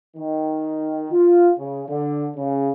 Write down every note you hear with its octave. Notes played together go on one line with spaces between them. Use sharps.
D#3
F4
C#3
D3
C#3